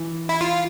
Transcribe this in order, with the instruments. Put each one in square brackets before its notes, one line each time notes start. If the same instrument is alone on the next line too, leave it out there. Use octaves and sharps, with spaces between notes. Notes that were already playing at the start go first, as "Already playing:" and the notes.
Already playing: [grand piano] E3
[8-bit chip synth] E4
F4